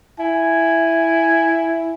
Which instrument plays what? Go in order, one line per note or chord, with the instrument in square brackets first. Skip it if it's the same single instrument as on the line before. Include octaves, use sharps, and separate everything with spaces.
[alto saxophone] E4 [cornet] G#5